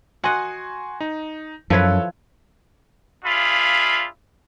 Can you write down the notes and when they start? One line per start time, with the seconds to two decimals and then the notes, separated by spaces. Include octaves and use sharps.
0.24 F#4 D#5 F#5 G#5 C6
1.00 D#4
1.70 F#2 F3 E4 A4 B4 C#5 G#6
3.25 D4 F4 G#4 E5 F5 B5